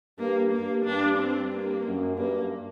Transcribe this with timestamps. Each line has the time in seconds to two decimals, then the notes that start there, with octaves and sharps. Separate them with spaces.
0.18 G2 A#3
0.52 G2 A#3
0.85 G2 D4
1.18 G2 C4
1.52 A#3
1.85 F#2
2.17 G2 A#3